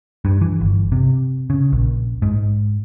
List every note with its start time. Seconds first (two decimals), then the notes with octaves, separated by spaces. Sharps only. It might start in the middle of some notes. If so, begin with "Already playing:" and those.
0.25 G2
0.41 E3
0.61 G1
0.92 C3
1.50 C#3
1.72 A#1
2.22 G#2